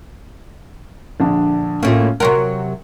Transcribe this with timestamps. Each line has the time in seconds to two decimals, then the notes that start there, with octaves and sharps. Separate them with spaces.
1.20 A#1 D3 D4
1.83 A2 A#3 C#4 F4
2.20 C3 F#3 A#4 F#5 C6 C#6